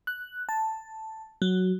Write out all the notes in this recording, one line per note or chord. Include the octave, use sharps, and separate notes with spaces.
F#6
A5
F#3